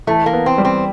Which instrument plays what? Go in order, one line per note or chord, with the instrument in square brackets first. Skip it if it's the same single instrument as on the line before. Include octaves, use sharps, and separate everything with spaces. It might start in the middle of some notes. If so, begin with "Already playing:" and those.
[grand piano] E3 [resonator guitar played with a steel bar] A3
[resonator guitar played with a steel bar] A#3
[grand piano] B3
[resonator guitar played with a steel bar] C4
[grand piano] G3
[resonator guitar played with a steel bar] C4